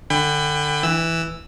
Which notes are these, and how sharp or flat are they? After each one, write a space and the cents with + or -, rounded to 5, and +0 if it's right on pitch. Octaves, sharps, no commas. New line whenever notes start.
D3 +25 G5 +30 B5 +20
E3 +0 E6 +0